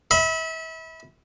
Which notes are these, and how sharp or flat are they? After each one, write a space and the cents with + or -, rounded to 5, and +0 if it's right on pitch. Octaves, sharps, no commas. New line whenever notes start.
E5 -35 B5 +0